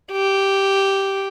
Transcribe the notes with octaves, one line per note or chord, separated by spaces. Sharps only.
G4